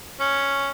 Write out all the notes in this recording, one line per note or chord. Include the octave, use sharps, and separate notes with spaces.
C#4